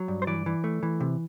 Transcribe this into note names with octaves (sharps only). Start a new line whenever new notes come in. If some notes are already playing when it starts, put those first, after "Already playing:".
Already playing: F#3
G2
C5
E3 D5
E3
A3
E3
C3